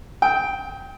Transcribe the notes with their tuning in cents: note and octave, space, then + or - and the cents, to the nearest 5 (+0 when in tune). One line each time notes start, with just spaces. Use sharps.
G5 +0 D#6 +45